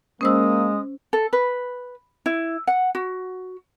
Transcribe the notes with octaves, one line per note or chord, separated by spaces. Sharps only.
G#3 A#3 C#4 C5 D#6 E6
A4
B4
E4
F#5
F#4